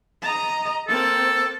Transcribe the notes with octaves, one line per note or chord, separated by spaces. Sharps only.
D#5 A#5
A#3 C4 A4